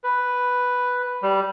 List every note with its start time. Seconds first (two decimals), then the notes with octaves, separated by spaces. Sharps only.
0.04 B4
1.22 G3